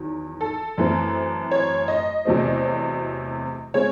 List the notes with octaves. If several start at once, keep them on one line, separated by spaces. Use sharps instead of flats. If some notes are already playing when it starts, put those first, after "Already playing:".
Already playing: E2 D#3 F#3
A4
F#2 E3 A3 C4
C#5
D#5
E2 C3 F#3 A3 C4
C#3 G#3 C4 C#5